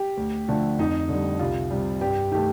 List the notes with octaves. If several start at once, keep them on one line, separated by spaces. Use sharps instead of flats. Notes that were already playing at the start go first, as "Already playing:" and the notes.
Already playing: G4
D2
D3 F3 A3
F2 D#4
D3 G3
C2 F4
C3 G3
G2 G4
D#3 A3 G4